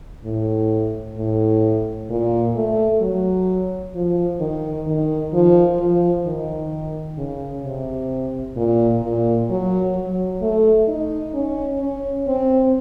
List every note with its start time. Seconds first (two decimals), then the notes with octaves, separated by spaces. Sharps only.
0.24 A2
1.17 A2
2.10 A#2
2.55 A3
3.01 F#3
3.95 F3
4.40 D#3
4.87 D#3
5.34 F3
5.80 F3
6.25 D#3
7.17 C#3
7.64 C3
8.57 A#2
9.03 A#2
9.50 F#3
9.95 F#3
10.41 A3
10.88 D#4
11.34 C#4
11.80 C#4
12.27 C4